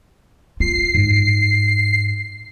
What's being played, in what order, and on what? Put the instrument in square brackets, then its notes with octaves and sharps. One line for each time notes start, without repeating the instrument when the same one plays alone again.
[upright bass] F4 [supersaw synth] C7
[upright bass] G#2